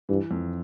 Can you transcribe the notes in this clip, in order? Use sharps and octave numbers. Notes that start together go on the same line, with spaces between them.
G2 E3
F2